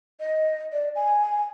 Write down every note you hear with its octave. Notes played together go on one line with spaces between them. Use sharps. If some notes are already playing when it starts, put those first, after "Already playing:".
D#5
D5
G#5